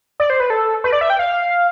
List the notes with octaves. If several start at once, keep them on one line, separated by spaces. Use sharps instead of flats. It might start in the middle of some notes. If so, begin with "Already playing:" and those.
D5
C5
B4
A4
B4
D5
E5
G5
F5